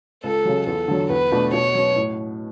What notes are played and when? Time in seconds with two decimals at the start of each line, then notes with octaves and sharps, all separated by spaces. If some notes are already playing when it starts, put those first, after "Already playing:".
0.24 C#2 A4
0.45 C#3 F#3
0.66 E2 A4
0.88 D3 F#3
1.10 E2 B4
1.32 B2 A3 D4
1.53 B2 C#5
1.75 F#3 C#4
1.96 A2